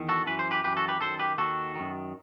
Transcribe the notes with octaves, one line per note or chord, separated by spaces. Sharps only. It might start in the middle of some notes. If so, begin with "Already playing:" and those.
Already playing: E2 D#3
F#4 A4
F#2 E3 B4
C5
G4 B4
F#2 E3 G4 B4
F#4 A4
G4 B4
F#2 D#3 A4 C5
G4 B4
D#2 D#3 F#4 A4
F#2 D#3